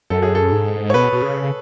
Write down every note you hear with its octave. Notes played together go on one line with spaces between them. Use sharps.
F#2 A4
G#4
A4
G#2
C#5
B2 B4
B2
C#3